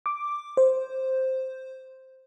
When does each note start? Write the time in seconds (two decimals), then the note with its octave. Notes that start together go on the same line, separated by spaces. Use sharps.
0.06 D6
0.57 C5